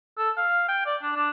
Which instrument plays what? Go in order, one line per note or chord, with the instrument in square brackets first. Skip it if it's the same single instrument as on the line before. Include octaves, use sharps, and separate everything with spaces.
[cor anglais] A4
F5
G5
D5
D4
D4